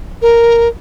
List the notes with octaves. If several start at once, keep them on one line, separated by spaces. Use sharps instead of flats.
A#4